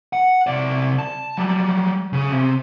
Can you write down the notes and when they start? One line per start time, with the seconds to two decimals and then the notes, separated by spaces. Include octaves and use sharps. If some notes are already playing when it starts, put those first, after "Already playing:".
0.13 F#5
0.47 C3 D5
0.99 A5
1.38 F#3 G3
2.13 C#3 G#4
2.31 C3